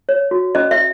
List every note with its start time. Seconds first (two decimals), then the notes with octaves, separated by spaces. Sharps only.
0.09 C#5
0.31 F#4
0.55 C#4 D#5
0.71 E5